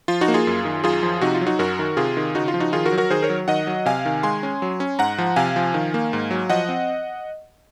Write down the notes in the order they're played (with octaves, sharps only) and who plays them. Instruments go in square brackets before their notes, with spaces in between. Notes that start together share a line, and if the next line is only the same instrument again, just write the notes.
[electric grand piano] F3 F4
D#4 F#4
A#3
F4 G#4
F#2
D#3
F#2 F4 G#4
F3
C3 D#4 F#4
F4
F#3
D#4 F#4
F#2 F#4 A#4
D#3
C3 F4 G#4
D#3
C#3 D#4 F#4
F4
F3
D#4 F#4
D#3 F4 G#4
F#4 A#4
F#3
F#4 A#4
D#3 G#4 C5
A#4 C#5
F#3
D#3 D#5 F#5
F#3
C3 F5 G#5
D#3
G#3 G#5 C6
C#4
F#3
C#4
G#2 F#5 A#5
F3
C3 F5 G#5
F3
D#3
A#3
G#2
F#3
F3 D#5 F#5
C4